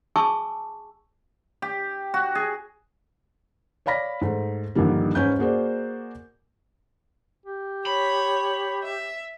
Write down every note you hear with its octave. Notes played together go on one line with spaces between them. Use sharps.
G#4 G#5 A5 C#6 D6 E6
G4
F#4
G#4
C#5 D5 F5 B5 A#6 B6
G#2 A3
A#1 G2 D3 D#3 G3 A#3
G#2 C#4 B4 G6
A#3 F#4 G#4 C5 D5
G4
C#5 B5
E5